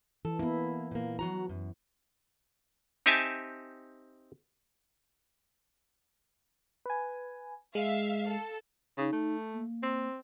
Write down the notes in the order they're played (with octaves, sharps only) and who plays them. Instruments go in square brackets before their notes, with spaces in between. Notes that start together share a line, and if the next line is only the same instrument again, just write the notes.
[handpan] E3 [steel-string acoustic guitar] A4
[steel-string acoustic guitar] A#3 [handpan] B3 E4
[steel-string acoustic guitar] A#2 A#3
F#3 F#4 A#5
F#2
[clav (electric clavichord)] C4 D#4 G4 E5 G#5 A5
[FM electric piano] B4 G#5
[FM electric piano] G#3 [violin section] E5 F5
[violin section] A4
[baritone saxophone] C#3 [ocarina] D#4
[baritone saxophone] A3
[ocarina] A#3
[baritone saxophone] C4